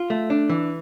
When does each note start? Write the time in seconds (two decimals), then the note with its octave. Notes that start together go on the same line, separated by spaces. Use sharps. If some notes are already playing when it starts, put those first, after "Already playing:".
Already playing: F4
0.10 A3
0.30 D4
0.49 E3